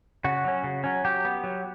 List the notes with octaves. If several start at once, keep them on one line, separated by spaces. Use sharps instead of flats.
C#3 F#4
F#3 C#4
C#3
F#3 C#4
F#3 G4
B3
F#3